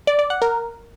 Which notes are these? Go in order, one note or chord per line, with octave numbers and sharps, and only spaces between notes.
D5
D5
F#5
A#4